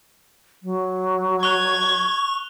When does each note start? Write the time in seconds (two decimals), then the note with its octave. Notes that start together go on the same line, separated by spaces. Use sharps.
0.63 F#3
1.43 C#6 F#6 G#6 F7 G7